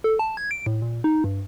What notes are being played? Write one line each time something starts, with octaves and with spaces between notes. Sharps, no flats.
A4
A5
G#6
D7
A2
A#2
D#4
G2